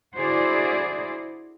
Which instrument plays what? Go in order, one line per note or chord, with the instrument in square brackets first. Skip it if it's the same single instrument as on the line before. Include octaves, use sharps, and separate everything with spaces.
[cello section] D3 E4 F#4 G#4 C5 D5